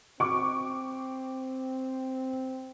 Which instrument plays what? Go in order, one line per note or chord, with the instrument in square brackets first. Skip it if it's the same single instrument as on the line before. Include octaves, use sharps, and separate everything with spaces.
[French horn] C4 [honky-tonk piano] C#6 D6